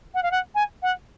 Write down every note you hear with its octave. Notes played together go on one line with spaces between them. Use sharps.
F#5
F5
F#5
G#5
F#5